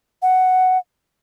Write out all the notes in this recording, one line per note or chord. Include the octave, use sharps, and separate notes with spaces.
F#5